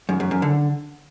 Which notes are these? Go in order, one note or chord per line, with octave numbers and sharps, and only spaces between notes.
F#2
F#2
F#2
D3